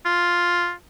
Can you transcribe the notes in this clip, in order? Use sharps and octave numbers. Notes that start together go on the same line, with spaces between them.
F4